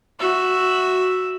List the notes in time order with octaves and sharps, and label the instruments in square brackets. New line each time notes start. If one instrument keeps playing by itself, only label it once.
[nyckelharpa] F#4 E5